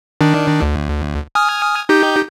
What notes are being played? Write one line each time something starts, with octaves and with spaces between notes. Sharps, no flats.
D#3 D4
D2
G#5 D#6 F6
D#4 G4 G6